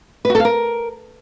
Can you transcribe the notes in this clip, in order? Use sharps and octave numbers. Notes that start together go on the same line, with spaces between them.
B4
F#4
A4
F5
A#4